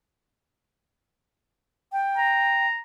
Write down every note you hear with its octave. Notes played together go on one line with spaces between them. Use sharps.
G5
A#5